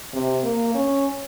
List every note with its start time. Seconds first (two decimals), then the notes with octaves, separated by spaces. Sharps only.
0.13 C3
0.43 A#3
0.75 C#4